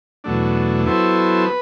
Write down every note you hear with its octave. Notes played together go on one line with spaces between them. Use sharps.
E2 B2 F#3 A3 D4
F#3 B3 E4 A4 C5
B4